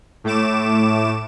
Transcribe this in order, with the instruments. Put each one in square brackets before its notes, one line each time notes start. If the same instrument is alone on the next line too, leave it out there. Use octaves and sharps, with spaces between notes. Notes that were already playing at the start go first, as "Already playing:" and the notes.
[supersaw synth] A2 A3 D6 E7